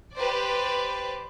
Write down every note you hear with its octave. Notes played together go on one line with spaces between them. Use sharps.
G4 B4 C5 D5